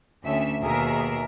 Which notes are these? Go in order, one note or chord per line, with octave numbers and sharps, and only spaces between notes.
D2 A3 C#4 E5
D#2 B2 G#4 A#4 E5